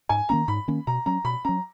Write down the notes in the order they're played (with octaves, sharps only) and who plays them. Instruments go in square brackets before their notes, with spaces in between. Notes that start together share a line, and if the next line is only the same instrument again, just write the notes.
[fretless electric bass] G#2 [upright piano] G#5
[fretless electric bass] D#3 A#3 C#4 [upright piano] A#5
[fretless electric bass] G#2 [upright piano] B5
[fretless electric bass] D#3 A#3 C#4
[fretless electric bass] B2 [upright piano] A#5
[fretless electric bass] F#3 C#4 [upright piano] A#5
[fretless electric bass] B2 [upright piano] B5
[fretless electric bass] F#3 C#4 [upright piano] A#5